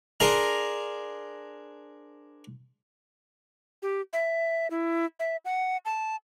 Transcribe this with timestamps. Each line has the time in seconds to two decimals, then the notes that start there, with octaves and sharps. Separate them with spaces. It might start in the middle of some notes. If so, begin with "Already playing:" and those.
0.20 D4 G#4 A#4 C5 F5 A#5
3.82 G4
4.13 E5
4.71 E4
5.20 E5
5.45 F#5
5.85 A5